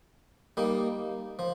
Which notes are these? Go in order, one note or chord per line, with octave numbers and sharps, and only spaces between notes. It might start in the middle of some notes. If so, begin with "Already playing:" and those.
G3 A#3 D#4
F3